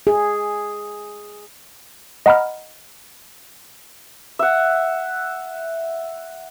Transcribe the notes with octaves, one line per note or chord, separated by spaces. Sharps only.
G#4
D#5 F#5 A#5 B5 F6
E5 F#5